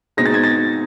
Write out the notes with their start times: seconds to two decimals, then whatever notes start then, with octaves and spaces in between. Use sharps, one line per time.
0.17 B2 G#3 C4 D#4 A#6
0.26 A6
0.34 G#6
0.44 A6